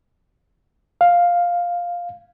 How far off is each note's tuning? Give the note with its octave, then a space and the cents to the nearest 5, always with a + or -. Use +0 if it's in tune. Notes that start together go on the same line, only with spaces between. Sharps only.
F5 +5